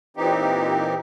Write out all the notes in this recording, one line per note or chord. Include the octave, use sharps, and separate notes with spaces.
A#2 E3 C4 D#4 G4